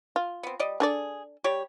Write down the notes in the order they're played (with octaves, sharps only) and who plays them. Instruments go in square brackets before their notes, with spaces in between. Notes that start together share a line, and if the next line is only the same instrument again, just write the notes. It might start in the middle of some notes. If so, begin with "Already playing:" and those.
[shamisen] F4
[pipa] B3 C4
G3 D5 D#5
[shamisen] D4 A4 D5 [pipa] G#4
[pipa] G3 G4 C#5